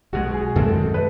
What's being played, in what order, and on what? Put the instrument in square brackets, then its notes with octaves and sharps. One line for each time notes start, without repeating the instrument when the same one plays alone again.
[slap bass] B1 B2 G#3 [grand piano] F#4
[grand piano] G#4
[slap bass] F#2 D#3 G#3 C4 [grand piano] A4
[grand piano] B4